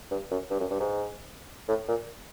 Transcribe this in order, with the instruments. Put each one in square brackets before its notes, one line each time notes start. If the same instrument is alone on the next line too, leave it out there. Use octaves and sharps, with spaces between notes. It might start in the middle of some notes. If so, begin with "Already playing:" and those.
[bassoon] G2
F#2
G2
F#2
G2
G#2
A2
A#2